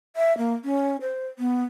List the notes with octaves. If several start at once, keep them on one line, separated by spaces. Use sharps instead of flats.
E5
A#3
C#4
C5
B3